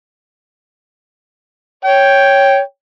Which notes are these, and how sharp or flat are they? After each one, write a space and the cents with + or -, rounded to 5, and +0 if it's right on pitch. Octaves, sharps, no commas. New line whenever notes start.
C#5 +0 G5 +0